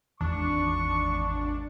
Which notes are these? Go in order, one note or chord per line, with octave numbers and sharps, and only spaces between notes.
G#1 E2 D4 C#6